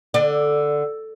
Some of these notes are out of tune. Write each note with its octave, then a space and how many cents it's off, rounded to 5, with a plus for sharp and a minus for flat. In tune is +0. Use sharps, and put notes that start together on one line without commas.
D3 +0 D5 +20